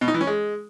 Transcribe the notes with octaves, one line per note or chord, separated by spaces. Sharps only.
B2
D#4
E3
C#4
G#3